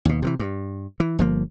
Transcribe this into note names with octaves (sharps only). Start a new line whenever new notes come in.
D#2 B2
C3 D#3 E3
G2
E3
G1 F3 A#3